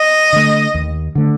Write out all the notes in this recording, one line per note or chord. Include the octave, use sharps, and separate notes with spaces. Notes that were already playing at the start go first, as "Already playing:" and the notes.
Already playing: D#5
D3 A3
D#2
D3 A3